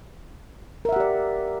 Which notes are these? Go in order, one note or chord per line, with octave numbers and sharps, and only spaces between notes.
G4 A#4 D5 E5 F#5